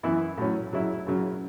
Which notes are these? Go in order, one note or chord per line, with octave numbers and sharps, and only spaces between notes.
F#2 E3 B3 E4
A2 F#3 C#4
C#3 F#3 C#4 E4
F#2 C#3 F#3 C#4